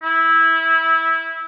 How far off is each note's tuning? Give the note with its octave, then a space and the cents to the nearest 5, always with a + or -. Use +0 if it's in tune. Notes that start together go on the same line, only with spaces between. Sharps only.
E4 -15